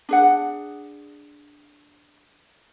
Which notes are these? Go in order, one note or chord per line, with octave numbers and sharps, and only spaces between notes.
D4 G#4 F#5